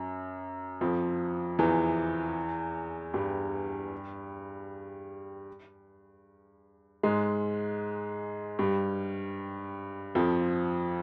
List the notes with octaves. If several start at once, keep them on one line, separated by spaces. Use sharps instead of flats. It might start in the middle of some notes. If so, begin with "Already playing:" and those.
Already playing: F#2
F2 F3
E2 E3
G2 G3
G#2 G#3
G2 G3
F2 F3